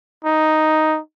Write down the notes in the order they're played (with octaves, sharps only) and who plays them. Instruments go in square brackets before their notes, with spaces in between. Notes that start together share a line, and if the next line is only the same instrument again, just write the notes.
[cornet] D#4